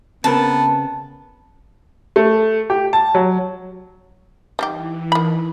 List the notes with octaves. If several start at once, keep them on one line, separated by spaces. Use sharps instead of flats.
C#3 B3 C4 A#4 A5
A3
G4
A5
F#3
E3 G3 D#4 G4
D#3 B5